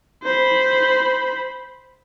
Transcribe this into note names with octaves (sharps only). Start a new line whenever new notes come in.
C5 B5